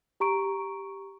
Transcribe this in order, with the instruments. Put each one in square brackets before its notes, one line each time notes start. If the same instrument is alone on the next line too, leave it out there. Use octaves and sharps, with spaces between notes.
[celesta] G4 A#5 C#6 D7